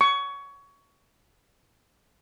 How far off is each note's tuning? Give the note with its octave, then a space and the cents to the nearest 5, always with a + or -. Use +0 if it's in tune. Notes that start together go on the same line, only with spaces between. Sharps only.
C#6 +20